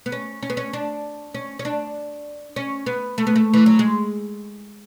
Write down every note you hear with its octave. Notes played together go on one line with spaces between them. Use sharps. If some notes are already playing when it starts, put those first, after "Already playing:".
B3
C#4
C#4
B3
C#4
D4
C#4
C#4
D4
C#4
B3
A3
B3
A3
E3
F#3
G#3